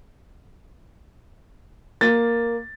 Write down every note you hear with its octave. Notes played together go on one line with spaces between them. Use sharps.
A#3 A6